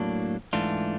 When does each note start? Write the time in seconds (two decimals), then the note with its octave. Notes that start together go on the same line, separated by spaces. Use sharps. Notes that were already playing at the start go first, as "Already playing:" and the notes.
Already playing: A2 F#3 A#3 D4
0.53 G#2 E3 A3 D4 F4